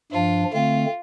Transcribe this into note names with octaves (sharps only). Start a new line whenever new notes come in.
G2 F3 D4 F4
D3 A3 C4 F4